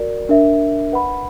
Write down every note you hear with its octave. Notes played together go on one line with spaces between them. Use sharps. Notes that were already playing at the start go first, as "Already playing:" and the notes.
Already playing: F#4 A#4 D5
D4 A#4 E5
B4 F#5 B5